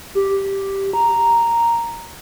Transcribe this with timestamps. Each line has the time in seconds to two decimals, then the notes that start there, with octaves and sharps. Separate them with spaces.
0.15 G4
0.93 A#5